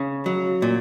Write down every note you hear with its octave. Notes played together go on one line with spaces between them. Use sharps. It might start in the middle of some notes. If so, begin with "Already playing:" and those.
Already playing: C#3
F#3
A#2